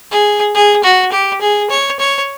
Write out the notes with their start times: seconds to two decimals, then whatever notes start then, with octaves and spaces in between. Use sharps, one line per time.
0.11 G#4
0.55 G#4
0.84 F#4
1.12 G4
1.41 G#4
1.70 C#5
2.00 C#5